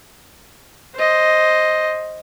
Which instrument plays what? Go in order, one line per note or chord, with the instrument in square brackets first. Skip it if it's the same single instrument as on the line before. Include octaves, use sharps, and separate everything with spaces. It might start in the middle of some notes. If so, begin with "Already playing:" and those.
[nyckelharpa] C5 D#5